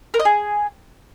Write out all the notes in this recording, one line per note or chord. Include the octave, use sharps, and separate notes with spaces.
A#4
D#5
G#4